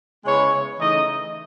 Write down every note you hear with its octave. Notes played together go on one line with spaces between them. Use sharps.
C#3 G#3 B3 E4 C#5
C#3 E3 A3 D#4 D#5